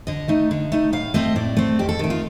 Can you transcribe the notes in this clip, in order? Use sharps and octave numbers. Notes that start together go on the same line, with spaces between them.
D3 D#5
A3 D#4
D3
A3 D#4
A2 F5
A3 C4 D#5
A2 D5
A3 C4
F2 G4
A4
D#3 A3
F4